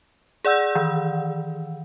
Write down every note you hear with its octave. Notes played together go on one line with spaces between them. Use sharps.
G#4 D5 F#5 E6 G6
D#3 E3